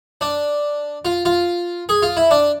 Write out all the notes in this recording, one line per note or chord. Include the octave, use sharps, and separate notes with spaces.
D4
F4
F4
G#4
F4
E4
D4